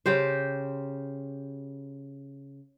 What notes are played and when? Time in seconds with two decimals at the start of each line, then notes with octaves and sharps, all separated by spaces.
0.06 C#3 G4 C5